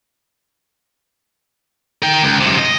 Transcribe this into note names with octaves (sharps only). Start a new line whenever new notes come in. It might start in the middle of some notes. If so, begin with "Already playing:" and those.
A#4 G5
C#2
F#2 C3
D#5